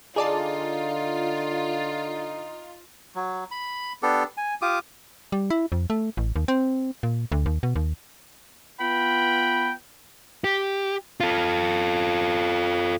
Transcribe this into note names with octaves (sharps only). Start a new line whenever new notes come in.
D3 D#4 F4 G#4 D5 A5
F#3
B5
B3 D4 G4 A4
G#5
F4 G4 D6 D#6
G3
E4
F2
A3
A1
D#2
C4
A#2
D2
D#2
B2
D#2
B3 F4 B4 G5 B5
G4
F4 A4